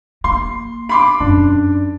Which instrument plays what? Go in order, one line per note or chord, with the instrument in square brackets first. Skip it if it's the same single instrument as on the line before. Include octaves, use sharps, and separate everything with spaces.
[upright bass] A#3 [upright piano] C6
[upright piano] B5 C6 D6
[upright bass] F#2 D#4 [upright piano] D4